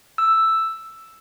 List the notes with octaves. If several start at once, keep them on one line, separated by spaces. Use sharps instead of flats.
E6